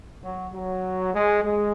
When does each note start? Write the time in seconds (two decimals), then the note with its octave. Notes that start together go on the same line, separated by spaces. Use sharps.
0.23 F#3
0.53 F#3
1.14 G#3
1.44 G#3